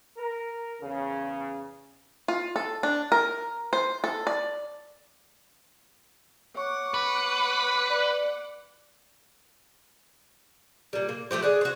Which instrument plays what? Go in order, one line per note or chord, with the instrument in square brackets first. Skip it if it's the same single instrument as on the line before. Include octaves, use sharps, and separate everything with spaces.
[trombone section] A#4
E2 C#3
[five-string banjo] F4
A4
D4
A#4
C5
A4
D5
[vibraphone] C#5 C#6 [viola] F#5 D6
[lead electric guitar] B4
[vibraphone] D5
[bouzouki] A#2 G3
A#3
F3 A3 G4 C5
G#4 D5 F#5
F#4 C5